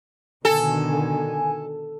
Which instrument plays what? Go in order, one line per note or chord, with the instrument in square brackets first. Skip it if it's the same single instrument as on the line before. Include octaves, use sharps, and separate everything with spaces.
[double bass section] B2 D3 D#3 [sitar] A4 [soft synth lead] G#5